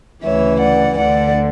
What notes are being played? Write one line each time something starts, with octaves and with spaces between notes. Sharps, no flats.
D2 C#3 E3 C#5 E5
D5 F#5
D2 D3 D5 F#5